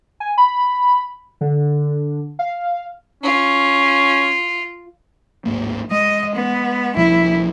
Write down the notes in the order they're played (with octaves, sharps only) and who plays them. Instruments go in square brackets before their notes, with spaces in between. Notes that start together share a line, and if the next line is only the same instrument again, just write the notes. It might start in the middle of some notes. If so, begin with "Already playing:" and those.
[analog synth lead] G#5
B5
D3
F5
[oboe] C#4 [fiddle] F4
[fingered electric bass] D1 G#1 A#3
[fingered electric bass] G#3 [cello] D#5
[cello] B3
[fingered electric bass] C2 A#2 F3 [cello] E4